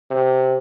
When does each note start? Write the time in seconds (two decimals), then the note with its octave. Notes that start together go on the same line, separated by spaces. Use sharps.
0.10 C3